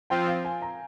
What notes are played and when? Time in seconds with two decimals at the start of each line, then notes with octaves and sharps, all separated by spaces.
0.10 F3 C4 F4 G5
0.27 F5
0.45 G#5
0.62 A#5